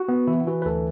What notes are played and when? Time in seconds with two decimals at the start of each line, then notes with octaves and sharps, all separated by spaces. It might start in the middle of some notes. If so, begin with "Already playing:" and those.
Already playing: F#4
0.08 B3
0.27 E3 E4
0.47 E3 F#4
0.62 B4
0.65 D2 A4